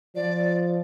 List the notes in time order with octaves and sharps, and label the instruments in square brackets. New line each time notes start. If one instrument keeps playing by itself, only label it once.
[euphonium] F3 [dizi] D5